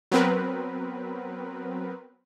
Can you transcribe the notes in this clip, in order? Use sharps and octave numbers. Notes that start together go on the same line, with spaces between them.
F#3 B3 C4 A#4 B4